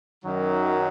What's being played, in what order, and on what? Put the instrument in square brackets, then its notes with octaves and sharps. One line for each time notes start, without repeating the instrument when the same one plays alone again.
[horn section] F#2 D#3 F#3